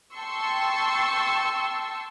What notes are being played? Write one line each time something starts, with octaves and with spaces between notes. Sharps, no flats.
G5 A5 C6 C#6 E6